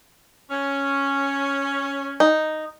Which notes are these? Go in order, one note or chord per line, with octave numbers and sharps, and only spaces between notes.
C#4
D#4